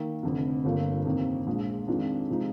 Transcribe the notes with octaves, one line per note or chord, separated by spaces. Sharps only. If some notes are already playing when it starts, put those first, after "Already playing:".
Already playing: D#3 A#3
F1 F2 D3
G1 G2 F3 A#3
F2 C3 D#3 A#3
A#1 A#2 G#3
F2 D#3 G#3 D4 F4
C3 F3 G#3 D#4